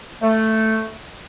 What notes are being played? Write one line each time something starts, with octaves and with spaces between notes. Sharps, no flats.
A3